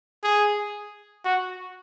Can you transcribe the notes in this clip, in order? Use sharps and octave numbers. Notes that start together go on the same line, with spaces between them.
G#4
F#4